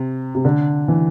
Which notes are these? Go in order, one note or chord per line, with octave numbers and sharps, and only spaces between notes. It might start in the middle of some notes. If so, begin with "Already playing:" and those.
Already playing: C3
C3
D3
E3